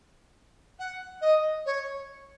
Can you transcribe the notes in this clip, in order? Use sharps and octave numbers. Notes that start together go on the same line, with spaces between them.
F#5
D#5
C#5